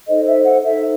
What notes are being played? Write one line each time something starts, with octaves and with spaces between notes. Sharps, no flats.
D#4 A4 C5 D#5
E5
F#5
D#4 A4 C5 E5